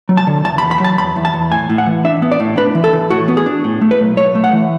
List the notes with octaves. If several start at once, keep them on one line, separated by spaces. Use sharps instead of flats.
F#3
A5
D3
E2 A5
B5
E2
B5
F#3 A5
E2 B5
E2
A5
E2
A2 G#5
A2
F#5
E3
D4 E5
B3
D5
A2
D4 B4
E3
A4
E3
A2 F#4
B3
G#4
D4
A2
A3
B4
B1
A3 C#5
A3
F#5
E3